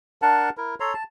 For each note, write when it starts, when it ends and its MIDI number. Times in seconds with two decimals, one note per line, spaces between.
0.22 0.50 62
0.22 0.50 70
0.22 0.50 78
0.22 0.50 81
0.57 0.75 64
0.57 0.75 70
0.80 0.94 69
0.80 0.94 73
0.80 0.94 82
0.80 0.94 84
0.94 1.04 81